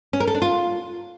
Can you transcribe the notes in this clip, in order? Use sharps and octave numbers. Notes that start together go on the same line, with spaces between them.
C#4
A#4
A4
D4
F4